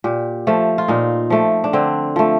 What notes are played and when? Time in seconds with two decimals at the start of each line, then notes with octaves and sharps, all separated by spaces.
0.04 A#2 G4
0.47 F3 A3
0.78 F4
0.88 A#2 D#4
1.30 F3 A3
1.64 D4
1.73 D3 C4
2.16 F3 A3